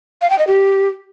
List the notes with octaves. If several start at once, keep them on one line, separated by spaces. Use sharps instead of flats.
F5
G5
D#5
G4